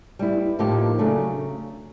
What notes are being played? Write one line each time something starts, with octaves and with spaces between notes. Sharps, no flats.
G3 B3 E4
A2 F3 A#3 D#4 G4
C#3 F#3 A3 D4